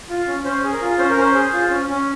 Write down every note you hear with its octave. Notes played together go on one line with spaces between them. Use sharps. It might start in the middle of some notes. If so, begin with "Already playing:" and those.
F4
C#4
C#4 C5
G#4
A#4
F4
C#4 C5
A#4
C#4 C5
G#4
F4
C#4
C#4